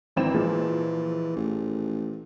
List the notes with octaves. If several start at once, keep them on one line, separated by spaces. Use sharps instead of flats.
G#1 E3 C4 E7
A#2 F3 G#3
A1